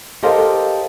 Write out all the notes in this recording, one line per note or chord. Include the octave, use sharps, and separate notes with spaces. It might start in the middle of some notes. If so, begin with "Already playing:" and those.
G4 A4 A#4 C5 D#5 F5